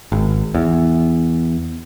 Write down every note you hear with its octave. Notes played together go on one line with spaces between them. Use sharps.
G#1
E2